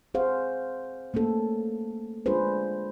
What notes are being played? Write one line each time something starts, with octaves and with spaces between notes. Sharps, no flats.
C4 G#4 C5 F5 F#5
A3 A#3 C#4 A4
G#3 D4 F4 G#4 B4 C5